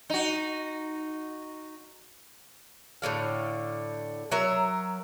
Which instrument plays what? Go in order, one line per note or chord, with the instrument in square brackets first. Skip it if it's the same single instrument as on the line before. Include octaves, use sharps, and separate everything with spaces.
[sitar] D#4 F#4
[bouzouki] A2 D3 F#3 F5
F#3 A#4 E5